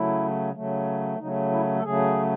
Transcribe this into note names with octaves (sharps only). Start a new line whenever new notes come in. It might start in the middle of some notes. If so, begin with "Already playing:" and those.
Already playing: C#3 F#3 A3 E4
C#3 F#3 A3
C#3 F#3 A3 D#4
E4
A4
C#3 F#3 A3 G#4